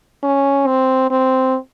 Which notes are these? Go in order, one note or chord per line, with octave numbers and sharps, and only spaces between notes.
C#4
C4
C4